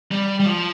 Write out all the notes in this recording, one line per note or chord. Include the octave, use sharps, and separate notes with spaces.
G3
G3
F3